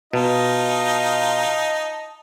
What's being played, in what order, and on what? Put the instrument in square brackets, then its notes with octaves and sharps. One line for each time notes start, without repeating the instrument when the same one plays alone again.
[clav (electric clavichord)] B2 [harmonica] D#4 F4 [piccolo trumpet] D#5 [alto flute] A5